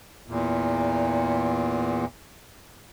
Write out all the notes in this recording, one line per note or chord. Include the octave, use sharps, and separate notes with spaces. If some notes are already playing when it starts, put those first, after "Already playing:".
E2 A#2